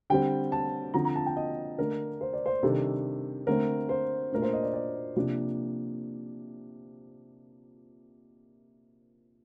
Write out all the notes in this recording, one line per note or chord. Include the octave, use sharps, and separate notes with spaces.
D3 G3 C4 G5
A5
D3 F3 C4 A#5
A#5
A5
G5
D#5
D3 A3 D4 A#4
C5
D5
C5
C3 D#3 G3 D4 A4
D3 A3 C4 A#4
C5
A#2 A3 D4 A#4
C5
D#5
D5
D5
C3 F3 A#3 D4